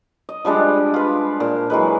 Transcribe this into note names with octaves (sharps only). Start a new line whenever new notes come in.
D#5
F3 G3 G#3 D4
F4 B4
A#2
E3 F#3 G#3 B4